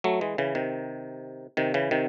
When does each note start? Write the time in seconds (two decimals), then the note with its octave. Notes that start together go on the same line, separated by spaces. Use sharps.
0.04 F#3 A3
0.21 E3 G#3
0.38 C#3 E3
0.55 C3 D#3
1.57 C3 D#3
1.74 C#3 E3
1.91 C3 D#3